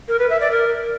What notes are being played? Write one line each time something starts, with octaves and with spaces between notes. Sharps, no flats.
A#4
B4
E5
D5
A#4